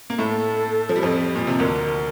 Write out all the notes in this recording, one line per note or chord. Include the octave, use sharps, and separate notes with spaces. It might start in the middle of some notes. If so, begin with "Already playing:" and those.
A#3
A2 A3 A4
F3
G3
F2 F3
A#2
C3
D2 D3 A#4